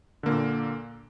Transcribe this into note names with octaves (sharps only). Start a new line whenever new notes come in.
A#2 D3 A#3